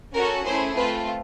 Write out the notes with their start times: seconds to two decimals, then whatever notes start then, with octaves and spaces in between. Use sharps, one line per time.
0.14 C#4 F#4 A4 A#4
0.45 A3 C#4 E4 G#4 C5
0.76 A3 C4 F4 B4